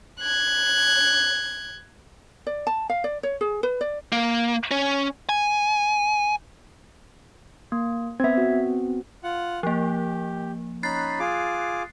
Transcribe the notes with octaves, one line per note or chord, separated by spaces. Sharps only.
F#6 G#6
D5
A5
F5
D5
C#5
G#4
B4
D5
A#3
C#4
G#5
A#3
B3 C4 E5 G#6
F#4
F4 F#5
F3 A#3 G4
C#4 D#4 B5 F#6 A6 C7
F4 G#4 D6